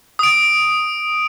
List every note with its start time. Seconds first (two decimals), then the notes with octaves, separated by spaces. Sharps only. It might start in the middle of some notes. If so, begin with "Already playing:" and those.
0.19 D#6 D7